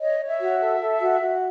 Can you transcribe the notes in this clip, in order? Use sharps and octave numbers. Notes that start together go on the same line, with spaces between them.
C#5 D#5
C#5
E5
F#4
A4
A4
F#4
F#4